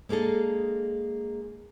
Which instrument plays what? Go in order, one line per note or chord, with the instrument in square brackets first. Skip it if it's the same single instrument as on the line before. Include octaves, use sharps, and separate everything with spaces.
[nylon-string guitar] G#3 A#3 D4 G#4 A4